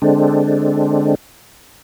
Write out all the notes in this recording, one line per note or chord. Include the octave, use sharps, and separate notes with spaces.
D3 G#3 C4 D4